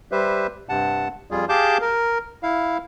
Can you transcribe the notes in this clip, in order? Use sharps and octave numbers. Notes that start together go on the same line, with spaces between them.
G3 G4 B4 C5 E5
G2 C3 F#5 A5
F2 G3 F4 G#4
G4 G#4 F5 A5 D6 G6
A#4
E4 F5